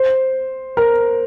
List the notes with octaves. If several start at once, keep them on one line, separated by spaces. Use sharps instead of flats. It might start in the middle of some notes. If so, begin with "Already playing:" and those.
Already playing: C5
A#4